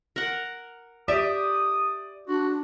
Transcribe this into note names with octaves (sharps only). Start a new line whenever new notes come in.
A#4 F#5
G4 D5 E5 D#6
D4 F#4